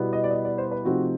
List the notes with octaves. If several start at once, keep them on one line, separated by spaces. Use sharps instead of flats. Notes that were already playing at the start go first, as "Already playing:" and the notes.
Already playing: B2 G3 B3 E4
D#5
D5
D#5
D5
C5
B4
C3 F3 A3 C4 D#4 F#4